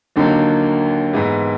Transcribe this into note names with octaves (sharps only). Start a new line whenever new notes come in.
D#2 D3 F#3 A#3 D#4
G#2 E3 G#3 B3